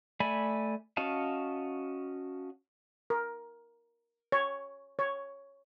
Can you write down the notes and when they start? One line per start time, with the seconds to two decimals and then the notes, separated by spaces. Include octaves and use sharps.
0.20 A3 D5 E5 G#5 B5
0.97 C#4 F#4 D#5 F5 A5
3.10 A#4
4.32 C#5
4.99 C#5